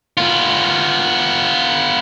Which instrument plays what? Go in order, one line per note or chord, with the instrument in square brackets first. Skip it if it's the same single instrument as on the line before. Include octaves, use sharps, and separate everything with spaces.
[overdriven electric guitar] B3 F4